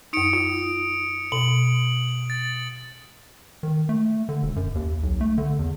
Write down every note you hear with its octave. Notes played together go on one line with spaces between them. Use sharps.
F#2 D#4 D#6 C#7 D7
F4
B2 F#7
A6
D#3
A3
D3
E1
F#2
D#2
B1
A3
D3
E2